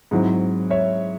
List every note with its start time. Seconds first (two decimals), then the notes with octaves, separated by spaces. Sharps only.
0.11 G#2 F#3 C4 E4
0.70 C#5 E5